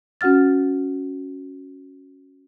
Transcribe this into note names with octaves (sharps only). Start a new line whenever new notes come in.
C#4 F#4 F#5 F6 A6